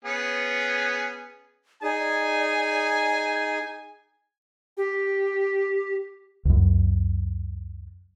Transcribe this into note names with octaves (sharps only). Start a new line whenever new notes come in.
B3 C#4 G#4
D#4 G#4 D5 G#5
G4
C#2 F#2